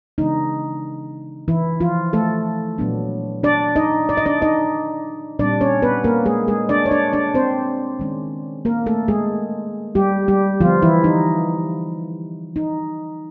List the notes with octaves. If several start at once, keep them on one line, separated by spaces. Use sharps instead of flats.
C#3 E3 G#3 B3 D4 D#4
E3 E4
F3 F4
A3 A4
A#2 F#3 B3 D4
D4 D5
D#4 D#5
D5
D#5
D4 D5
D#4 D#5
A#2 G3 C4 D4 D5
C#4 C#5
B3 B4
A#3 A#4
G#3 G#4
G#3 G#4
D4 D5
C#5
D4 D5
D4 D5
C4 C5
D#3 G#3 C#4
A#3 A#4
A3 A4
G#3 G#4
G3 G4
G3 G4
D3 F3 G3 B3 F4
E3 E4
D#4
D#4